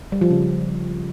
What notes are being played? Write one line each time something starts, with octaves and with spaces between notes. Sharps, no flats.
G3
F3
C#3